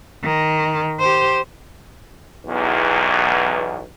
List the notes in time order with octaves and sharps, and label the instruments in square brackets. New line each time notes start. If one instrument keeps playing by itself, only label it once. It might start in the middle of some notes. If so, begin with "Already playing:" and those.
[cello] D#3
G4 C5
[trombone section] B1 E2